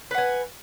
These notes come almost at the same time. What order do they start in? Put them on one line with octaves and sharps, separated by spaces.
B4 F#5 G#5